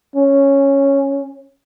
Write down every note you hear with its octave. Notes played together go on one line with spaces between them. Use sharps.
C#4